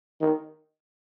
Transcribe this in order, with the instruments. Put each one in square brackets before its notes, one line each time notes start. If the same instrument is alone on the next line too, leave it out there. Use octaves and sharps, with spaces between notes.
[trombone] D#3